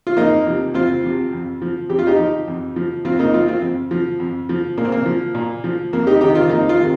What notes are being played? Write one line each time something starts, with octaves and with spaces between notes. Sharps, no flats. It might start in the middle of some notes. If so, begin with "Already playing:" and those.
F4
F2 A#3 D#4
C3 F3
F2 C4 F4
C3 F3
F2
F3
F2 G4
F4
D#4 G4
F3
F2
F3
F2 C4 F4
A#3 D#4
F3 C4 F4
C4 F4
F2
F3
F2
F3
A#2 A#3
C4
A#3
F3
A#2
F3
F2 A#3
D#4 G4
C3 D#3 D#4 G4
C4 F4
F2 A#3 D#4
C4 F4
C3 D#3